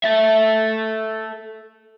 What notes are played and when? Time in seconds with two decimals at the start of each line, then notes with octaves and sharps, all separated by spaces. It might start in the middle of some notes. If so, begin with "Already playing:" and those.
0.04 A4 E5